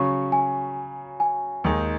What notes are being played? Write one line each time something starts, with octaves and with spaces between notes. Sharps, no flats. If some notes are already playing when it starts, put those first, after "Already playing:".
Already playing: C#3 F#3 C#4 C#6
G#5
G#5
D#2 D#3 G#3 D#4